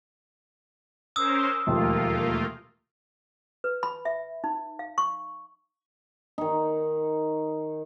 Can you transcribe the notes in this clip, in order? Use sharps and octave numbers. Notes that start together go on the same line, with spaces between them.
C#4 A#4 C5 D#6 E6
E1 D#2 F3 A3 A#3 F4
B4
B5
E5
D#4
F5
C#6
D#3 D#4